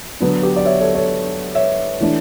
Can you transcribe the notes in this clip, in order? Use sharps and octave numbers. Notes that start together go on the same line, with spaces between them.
D3 F#3 B3 D4
G4 B4
D5
C#5 E5
A4 C#5
A4 C#5
C#5 E5
E3 A3 D4